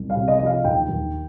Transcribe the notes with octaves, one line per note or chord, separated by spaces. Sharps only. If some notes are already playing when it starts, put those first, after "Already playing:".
Already playing: C2
F5
C3
D#5
F3 D#5
F5
D#2 G5
D#2